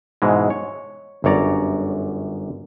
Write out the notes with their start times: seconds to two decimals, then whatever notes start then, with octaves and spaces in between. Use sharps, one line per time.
0.22 G#2 B2 E3 G#3
0.50 C#5
1.24 G1 F#2 C#5 D5 A#5